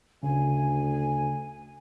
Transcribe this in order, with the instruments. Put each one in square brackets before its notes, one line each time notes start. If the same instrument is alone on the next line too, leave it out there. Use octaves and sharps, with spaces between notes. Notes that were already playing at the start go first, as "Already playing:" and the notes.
[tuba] D2 [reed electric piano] C#3 [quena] G#5